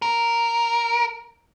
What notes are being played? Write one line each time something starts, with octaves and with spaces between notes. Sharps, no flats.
A#4